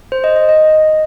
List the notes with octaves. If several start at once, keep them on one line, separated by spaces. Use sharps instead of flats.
C5
D#5
D#5
D#5